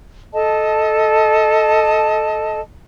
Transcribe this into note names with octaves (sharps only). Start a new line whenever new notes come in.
A4 D#5 A5